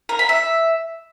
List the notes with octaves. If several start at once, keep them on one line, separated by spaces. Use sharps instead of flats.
A#4
B5
E5